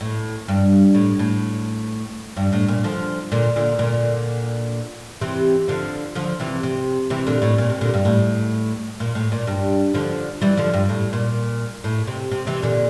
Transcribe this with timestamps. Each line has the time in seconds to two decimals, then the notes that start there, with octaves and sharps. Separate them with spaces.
0.01 A2
0.48 G2
0.95 A2
1.19 A2
2.37 G2
2.53 A2
2.68 A#2
2.84 D3 F3
3.32 A#2 D3
3.56 A#2 D3
3.79 A#2 D3
5.21 C3 E3
5.68 D3 F3
6.15 D3 F3
6.40 C3 E3
6.63 C3
7.10 C3 E3
7.27 A#2 D3
7.42 A2
7.58 A#2
7.70 C3
7.81 A#2 D3
7.94 G2
8.05 A2
9.00 A#2
9.15 A2
9.32 A#2
9.47 G2
9.94 D3 F3
10.41 E3 G3
10.57 D3 F3
10.74 G2
10.89 A2
11.13 A#2
11.84 A2
12.07 C3
12.31 C3
12.47 C3 E3
12.62 A#2 D3